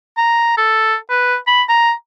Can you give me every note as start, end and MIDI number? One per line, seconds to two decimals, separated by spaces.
0.17 0.57 82
0.58 0.95 69
1.10 1.36 71
1.47 1.63 83
1.69 1.92 82